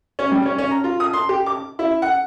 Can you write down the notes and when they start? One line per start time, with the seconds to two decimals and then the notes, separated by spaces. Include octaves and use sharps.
0.19 C#4
0.32 G3
0.46 C#4
0.58 C#4
0.71 A#5
0.84 F4
1.00 D#6
1.13 C6
1.29 G4
1.46 D6
1.79 E4
2.02 F#5